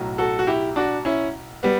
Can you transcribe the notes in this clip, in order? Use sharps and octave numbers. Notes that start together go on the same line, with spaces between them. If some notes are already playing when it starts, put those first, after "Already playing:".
Already playing: B1 A2 F#3
F#4 A4
F#4
E4 G4
D4 F#4
C#4 E4
G3 B3